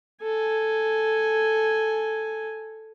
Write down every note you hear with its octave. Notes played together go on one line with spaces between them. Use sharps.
A4 G#5